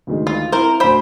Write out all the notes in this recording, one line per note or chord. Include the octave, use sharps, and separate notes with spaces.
D2 D#3 G#3
F4
C4 E4 A#4 C5
D2 C5 B5 D7